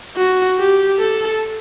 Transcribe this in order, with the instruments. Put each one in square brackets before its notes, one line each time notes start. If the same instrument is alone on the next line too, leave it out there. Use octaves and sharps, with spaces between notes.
[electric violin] F#4
G4
A4